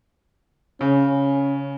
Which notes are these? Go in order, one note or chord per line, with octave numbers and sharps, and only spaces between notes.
C#3 C#4